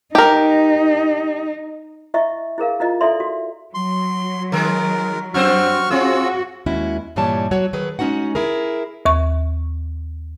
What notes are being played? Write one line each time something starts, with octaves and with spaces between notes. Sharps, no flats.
D#4 G4 A#4
E4 D#5 E5 C#6
E4 G#4 A#4 F5
E4 F4 D#5
E4 A4 D5 E5 C6
F#4
F#3 C6
D#3 G#3 A#4
F#2 C4 F#4 C5 C#6 F6
C4 F4 F#4 G#4 E6
D#2 G#3 C#4 E4 F#4
G2 A#2 E3 G3 C#5 A5
F#3 F#4 C#5
D#3 F#3 G#4 B4
G#3 C#4 D#4 F#4 F#5
E4 G#4 A#4
D#2 C#6